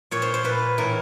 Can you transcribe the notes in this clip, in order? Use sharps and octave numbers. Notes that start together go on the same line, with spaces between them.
A#2 C#5
C5
C5
A#2 B4
A2 E3 A#4